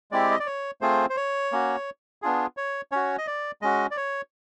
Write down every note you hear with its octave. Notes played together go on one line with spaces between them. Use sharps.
G#3 C4 E4 G4 D5
D#5
D5
C#5
A3 C4 F4 G#4 C5
C5
C#5
A#3 C#4 F#4
B3 D4 F4 G#4
C#5
C#4 F#4 C#5
D#5
D5
G#3 C#4 F#4 D#5
D5
C#5